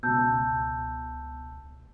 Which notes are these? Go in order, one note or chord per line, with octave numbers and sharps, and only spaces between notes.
C#2 B2 A5 E6 G6